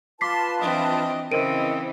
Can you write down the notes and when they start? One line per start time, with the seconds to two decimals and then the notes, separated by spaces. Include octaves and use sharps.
0.21 F4 B4 A5 C6 D6 B6 C7
0.60 E3 C4 D4 D#5
1.31 C#3 E3 C4 A#4 D#5 D7 D#7